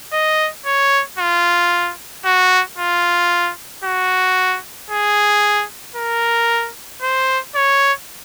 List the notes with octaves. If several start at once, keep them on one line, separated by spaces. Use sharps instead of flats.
D#5
C#5
F4
F#4
F4
F#4
G#4
A#4
C5
C#5